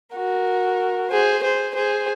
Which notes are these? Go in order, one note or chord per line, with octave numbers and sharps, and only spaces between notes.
F#4 A#4
G#4 C5
G#4 C5
G#4 C5